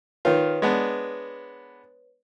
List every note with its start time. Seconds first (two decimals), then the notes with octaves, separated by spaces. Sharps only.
0.25 D#3 F4 B4 C#5
0.62 G#3 B3 D4